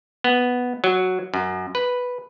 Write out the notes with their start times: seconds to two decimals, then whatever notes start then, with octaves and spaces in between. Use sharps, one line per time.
0.24 B3
0.84 F#3
1.34 F#2
1.75 B4